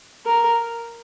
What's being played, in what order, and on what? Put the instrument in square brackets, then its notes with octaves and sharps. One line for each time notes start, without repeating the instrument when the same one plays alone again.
[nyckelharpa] A#4